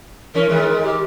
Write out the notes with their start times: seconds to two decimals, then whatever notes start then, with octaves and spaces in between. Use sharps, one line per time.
0.34 E3 C#4 A#4
0.49 D#3 G#3
0.83 G4